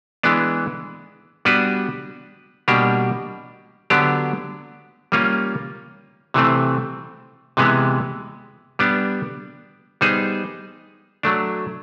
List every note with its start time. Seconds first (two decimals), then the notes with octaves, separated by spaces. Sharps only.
0.23 E3 G#3 B3 D4
1.45 G3 B3 D4 F#4 B4
2.68 B2 G3 A#3 D4 G4
3.90 D3 F#3 B3 D4 G4
5.12 G3 A#3 C#4 F4
6.34 C3 E3 A3 C4
7.57 C3 E3 G#3 B3
8.79 G3 B3 D4
10.01 G3 B3 D#4 G#4 C5
11.23 F#3 A3 D4